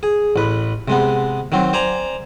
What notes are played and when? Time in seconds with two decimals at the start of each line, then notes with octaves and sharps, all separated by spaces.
0.03 G#4
0.36 A1 B4
0.88 C3 G#3 B3
1.52 D#3 F#3 C4
1.73 C5 D5 G#5 A#5